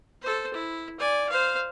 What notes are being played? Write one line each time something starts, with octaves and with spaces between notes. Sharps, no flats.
A4 C5
E4
D5 G#5
C5 F5